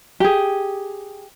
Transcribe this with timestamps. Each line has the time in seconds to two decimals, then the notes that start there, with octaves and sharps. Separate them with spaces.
0.20 G4 G#4